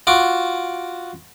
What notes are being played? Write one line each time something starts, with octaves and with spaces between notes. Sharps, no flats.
F4 F#4 D6